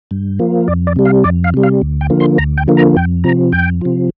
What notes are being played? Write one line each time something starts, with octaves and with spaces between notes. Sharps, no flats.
G2
F3 A#3
F2 D5
D5
C3 G3
F5
F2 D5
F5
C3 G3
F5
D2
G5
D3 F3 A#3
C6
D2 A#5
G5
D3 F3 A#3
A#5
F2 G5
C3 F3 A#5
F2 G5
C3 F3